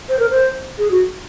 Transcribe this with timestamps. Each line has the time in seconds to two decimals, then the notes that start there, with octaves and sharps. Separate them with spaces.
0.09 C5
0.19 A#4
0.30 C5
0.78 G#4
0.91 F#4